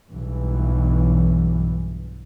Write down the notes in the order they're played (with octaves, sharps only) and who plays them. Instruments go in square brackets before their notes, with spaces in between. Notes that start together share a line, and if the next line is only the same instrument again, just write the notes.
[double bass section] B1 G2 E3